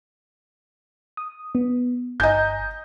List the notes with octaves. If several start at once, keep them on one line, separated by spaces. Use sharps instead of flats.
D#6
B3
G1 D#5 G#5 A#5 G6